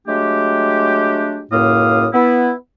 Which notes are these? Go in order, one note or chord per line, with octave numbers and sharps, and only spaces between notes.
F#3 G#3 A3 D4 G4
C#2 F#2 A2 A#3 F5 D#6
B3 E4